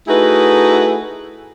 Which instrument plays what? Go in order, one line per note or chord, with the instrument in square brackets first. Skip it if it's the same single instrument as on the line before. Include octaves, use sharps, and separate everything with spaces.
[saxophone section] A3 D#4 E4 F#4 G#4 B4